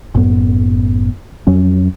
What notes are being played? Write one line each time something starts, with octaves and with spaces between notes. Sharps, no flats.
F#1 F#2 A2 B3
F2 F#3 C#4